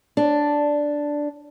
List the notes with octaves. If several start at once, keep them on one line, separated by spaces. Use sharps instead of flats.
D4